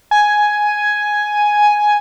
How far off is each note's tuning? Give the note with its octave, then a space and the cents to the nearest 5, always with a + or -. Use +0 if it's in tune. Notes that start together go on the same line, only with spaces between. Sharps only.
G#5 +5